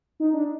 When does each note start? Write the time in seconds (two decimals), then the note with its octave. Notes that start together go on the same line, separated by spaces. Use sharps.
0.20 D#4
0.34 D4